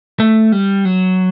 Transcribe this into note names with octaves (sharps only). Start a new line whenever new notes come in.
A3
G3
F#3